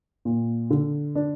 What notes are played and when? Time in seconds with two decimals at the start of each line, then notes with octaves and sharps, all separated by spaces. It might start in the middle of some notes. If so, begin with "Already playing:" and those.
0.25 A#2
0.70 D3
1.15 D4